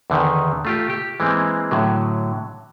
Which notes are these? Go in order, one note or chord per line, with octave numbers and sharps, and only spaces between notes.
E2 D3 D#3
A3 F4 G4
G4
E3 G#3 A#3 C4
A2 D3 F#3